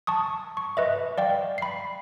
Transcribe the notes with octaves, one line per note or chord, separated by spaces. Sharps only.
A5 C#6 D#6
C#6
B4 D#5 E5
D5 F5 G5
B5 C7